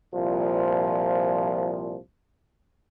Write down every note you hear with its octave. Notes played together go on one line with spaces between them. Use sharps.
C2 A#2 F3